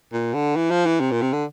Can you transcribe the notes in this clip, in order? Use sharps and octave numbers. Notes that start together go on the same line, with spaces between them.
A#2
D3
E3
F3
E3
C3
A#2
C3
D3